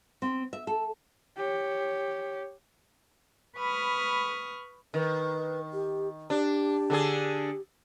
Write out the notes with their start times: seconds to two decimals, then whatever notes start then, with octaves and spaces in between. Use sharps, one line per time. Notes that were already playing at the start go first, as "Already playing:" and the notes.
0.22 C4
0.53 E5
0.67 A4
1.37 G4 C#5
3.57 B4 B5 C#6 D#6 F6
4.94 D#3 B4
5.73 G4
6.30 D4 G4
6.90 D3 D4 G#4